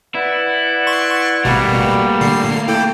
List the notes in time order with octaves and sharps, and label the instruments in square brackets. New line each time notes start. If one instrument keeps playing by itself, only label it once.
[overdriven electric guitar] E4 [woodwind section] B4 D5 F#5
[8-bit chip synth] C6 C#6
[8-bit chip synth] G#1 B2 [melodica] G3 [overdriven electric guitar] A3 A#3
[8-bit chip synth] A#2 D3 C7
[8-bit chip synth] E4 A4 [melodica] G5